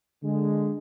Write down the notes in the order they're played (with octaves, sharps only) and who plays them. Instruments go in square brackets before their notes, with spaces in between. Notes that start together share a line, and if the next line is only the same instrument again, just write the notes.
[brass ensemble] D3 G#3